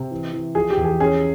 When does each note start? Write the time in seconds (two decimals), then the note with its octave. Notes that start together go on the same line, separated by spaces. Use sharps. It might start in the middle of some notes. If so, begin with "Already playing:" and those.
Already playing: C3
0.11 E3
0.33 E3
0.55 F3 G#4
0.70 G4
0.77 E2
0.84 G#4
1.00 C#4 G#4